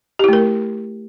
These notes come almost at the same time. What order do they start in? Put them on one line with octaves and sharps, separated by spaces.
G4 E4 A3 A#4